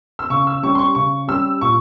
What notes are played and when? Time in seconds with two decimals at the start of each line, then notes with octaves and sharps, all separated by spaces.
0.19 E6
0.30 C#3 C#6
0.47 E6
0.63 G3 C#4 G4 C#6
0.75 C6
0.79 C#6
0.95 C#3 C#6
1.28 G3 C#4 G4 E6
1.61 A#2 C#6